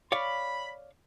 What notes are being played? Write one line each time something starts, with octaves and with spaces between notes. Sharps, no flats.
C#5 D5 F5 B5